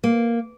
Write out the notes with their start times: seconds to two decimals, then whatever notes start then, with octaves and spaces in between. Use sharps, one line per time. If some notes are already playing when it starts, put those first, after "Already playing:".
0.04 A#3